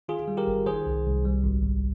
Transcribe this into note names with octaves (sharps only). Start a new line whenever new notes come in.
D#3 F4 G#4
G3
G4 A#4
G1
D#3 G#4 C5
C2
C2
G3
G#1
G#1